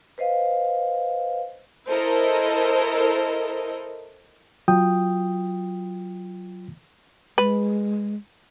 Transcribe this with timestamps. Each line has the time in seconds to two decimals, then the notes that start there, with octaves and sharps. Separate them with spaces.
0.18 B4 C5 D#5 F5
1.89 E4 A4 A#4 C5 D#5
4.68 F#3 F4 G5 D#6
7.38 G#3 B4